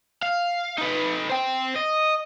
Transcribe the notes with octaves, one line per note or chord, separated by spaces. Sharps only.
F5
D#4 B4
C5 G5
D#5